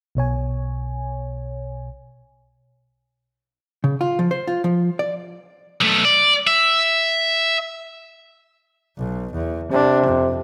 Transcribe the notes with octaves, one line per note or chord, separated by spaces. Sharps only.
B1 B2 C#5 G#5
C#3
F4
F3
C5
F4
F3
D5
B1 A3
D5
E5
B1
E2
C3 D4
F2